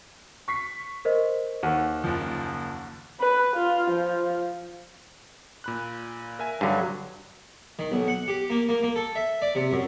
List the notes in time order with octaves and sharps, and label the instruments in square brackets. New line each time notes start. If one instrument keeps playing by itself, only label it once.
[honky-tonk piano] C#6 B6 C7
[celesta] A#4 C5 D#5
[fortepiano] D#2 F#4
[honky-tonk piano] F#1 F3
[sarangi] B4
F4
F3
[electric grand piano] A#2 B5 F#6
A#4 E5 G#5
[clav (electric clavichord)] G2 D3 [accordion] F#3
[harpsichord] D#3
B1
F#5
G4
A#3
A#3
A#3
A4
E5
D5
C3
F#2